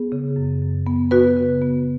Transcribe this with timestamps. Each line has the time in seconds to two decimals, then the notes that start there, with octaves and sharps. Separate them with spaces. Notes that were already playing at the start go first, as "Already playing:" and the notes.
Already playing: B3 G#4
0.12 C#3
0.36 F#2
0.62 F#2
0.86 B3
1.11 B3 F#4 B4
1.36 C#3
1.62 B3